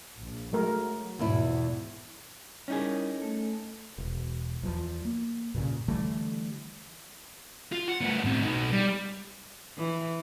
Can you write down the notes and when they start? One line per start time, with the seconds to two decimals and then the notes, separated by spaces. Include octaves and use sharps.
0.18 A#1
0.53 F#3 G#3 A3 A#4
1.19 E2 G#2 B2 F3 E4
2.68 G3 C#4 D#4 E4 G#4 A#4
3.18 A3 A4
3.98 E1
4.63 E2 F3
5.05 A#3
5.54 G2 A#2 C#3
5.88 D3 E3 G3 A3
7.72 F4
7.88 F#5
8.01 A3 B3
8.24 A2 C4
8.42 B2 D#4
8.72 G3
9.77 E3